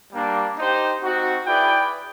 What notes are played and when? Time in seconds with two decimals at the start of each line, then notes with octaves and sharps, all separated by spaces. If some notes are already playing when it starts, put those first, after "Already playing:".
0.12 G3 A#3 D4
0.57 D#4 G4 C5
1.02 C4 D#4 F#4
1.47 E4 G#4 B4 D5 G5